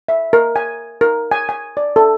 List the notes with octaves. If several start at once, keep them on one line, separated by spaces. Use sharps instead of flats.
E5
A#4
G#5
A#4
G#5
G#5
D5
A4